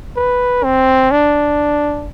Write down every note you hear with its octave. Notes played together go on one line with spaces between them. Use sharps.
B4
C4
D4